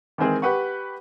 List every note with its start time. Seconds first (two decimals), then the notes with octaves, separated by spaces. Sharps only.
0.18 D#3 E3 G#3 C4 G#4 A#4
0.42 G4 B4 F#5 C#6